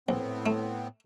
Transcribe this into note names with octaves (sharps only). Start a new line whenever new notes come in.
A#1 A2 B3 C4
A3